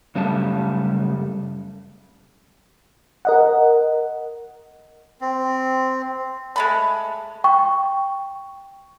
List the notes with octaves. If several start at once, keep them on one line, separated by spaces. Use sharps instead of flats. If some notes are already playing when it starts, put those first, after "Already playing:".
F#2 C#3 G3 A3 A5
A#4 D#5 F#5
C4
G#3 A3 B5
G5 C#6